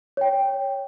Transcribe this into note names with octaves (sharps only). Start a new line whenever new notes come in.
C#5 G5